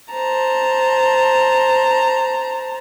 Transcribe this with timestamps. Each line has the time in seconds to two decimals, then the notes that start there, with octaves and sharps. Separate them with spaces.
0.11 C5 A5 A#5